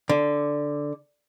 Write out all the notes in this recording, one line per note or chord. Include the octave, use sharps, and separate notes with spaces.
D3